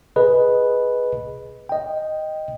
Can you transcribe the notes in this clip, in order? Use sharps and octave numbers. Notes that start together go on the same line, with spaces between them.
G#4 B4 D#5
D#5 G5